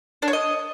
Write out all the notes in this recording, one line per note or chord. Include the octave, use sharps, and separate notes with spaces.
D4
C#5
D#5